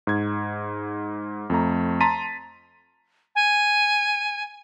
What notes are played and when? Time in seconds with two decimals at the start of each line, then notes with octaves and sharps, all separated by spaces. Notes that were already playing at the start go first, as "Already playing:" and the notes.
0.07 G#2 G#6
1.50 F2 A3 A#5
2.01 A5 A#5 C6 A6 B6 D#7
3.35 G#5